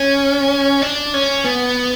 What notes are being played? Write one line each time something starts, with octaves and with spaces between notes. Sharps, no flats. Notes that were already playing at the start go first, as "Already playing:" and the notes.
Already playing: C#4
D4
C#4
B3